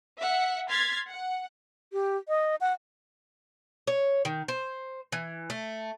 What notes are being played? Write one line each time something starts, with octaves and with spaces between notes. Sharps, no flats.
E5 F#5
C6 F6 G#6 A6 B6
F#5
G4
D#5
F#5
C#5
D#3
C5
E3
A3